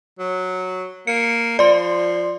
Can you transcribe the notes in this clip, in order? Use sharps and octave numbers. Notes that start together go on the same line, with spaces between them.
F#3
A#3 C#7
F3 D5 C6